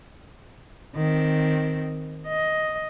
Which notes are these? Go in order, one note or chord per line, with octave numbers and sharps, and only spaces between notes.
D#3 C4
D#5